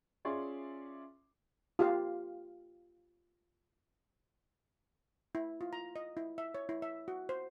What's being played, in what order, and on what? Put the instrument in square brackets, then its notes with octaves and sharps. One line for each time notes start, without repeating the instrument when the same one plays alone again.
[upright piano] C#4 F4 G#4 D5 E5 C6
[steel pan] F4 G4 F5
E4
F4
A#5
D#5
E4
E5
C#5
E4
E5
F#4
C5